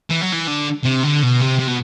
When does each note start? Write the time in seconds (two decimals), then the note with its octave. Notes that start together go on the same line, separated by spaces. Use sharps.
0.10 E3
0.22 F#3
0.33 E3
0.48 D3
0.85 C3
1.04 D3
1.23 B2
1.41 C3
1.60 C3
1.68 B2